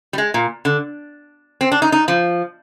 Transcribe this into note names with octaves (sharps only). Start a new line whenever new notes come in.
G3
G#3
A#2
D3
C4
D4
D#4
D#4
F3